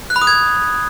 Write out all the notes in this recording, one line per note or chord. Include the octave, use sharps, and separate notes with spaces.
F#6
B5
D#6
G#6